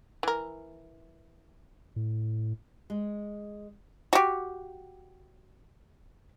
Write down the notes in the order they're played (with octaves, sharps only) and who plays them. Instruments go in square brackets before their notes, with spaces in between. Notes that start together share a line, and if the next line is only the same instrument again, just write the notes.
[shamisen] E3 A#4
[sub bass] A2
[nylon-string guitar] G#3
[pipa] F#4 G4